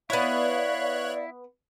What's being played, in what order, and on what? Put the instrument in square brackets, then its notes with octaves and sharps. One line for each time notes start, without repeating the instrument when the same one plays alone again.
[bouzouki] B3 F#5 [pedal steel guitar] E4 [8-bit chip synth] C#5 F#6 [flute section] D5 F5